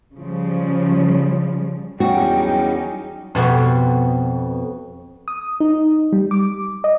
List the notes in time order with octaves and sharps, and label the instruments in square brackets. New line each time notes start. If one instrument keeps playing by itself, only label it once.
[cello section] C#3 F3 G3
[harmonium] E2 C#4 [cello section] F#3 G3 D#4 [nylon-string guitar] F#4 [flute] G5
[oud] F2 B2 F#4
[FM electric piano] D#6
D#4
G3
D6
D#5